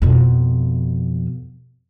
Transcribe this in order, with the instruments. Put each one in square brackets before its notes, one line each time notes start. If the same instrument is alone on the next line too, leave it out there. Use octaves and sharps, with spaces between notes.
[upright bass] F2 B2